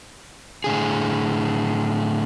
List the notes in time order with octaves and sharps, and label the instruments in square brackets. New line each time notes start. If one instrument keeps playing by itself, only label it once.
[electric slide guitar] A2 D3 G#4